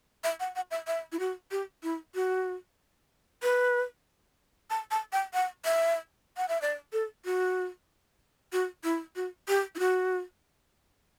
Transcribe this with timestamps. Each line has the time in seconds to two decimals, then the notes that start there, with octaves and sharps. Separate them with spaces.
0.24 E5
0.40 F#5
0.56 F#5
0.71 E5
0.87 E5
1.12 E4
1.19 F#4
1.51 G4
1.83 E4
2.15 F#4
3.42 B4
4.70 A5
4.91 A5
5.12 G5
5.33 F#5
5.65 E5
6.37 F#5
6.48 E5
6.62 D5
6.93 A4
7.25 F#4
8.52 F#4
8.84 E4
9.16 F#4
9.48 G4
9.75 E4
9.79 F#4